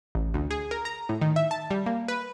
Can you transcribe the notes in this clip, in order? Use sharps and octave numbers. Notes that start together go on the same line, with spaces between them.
A1
D2
G#4
A#4
A#5
A2
D#3
E5
A5
G3
A#3
B4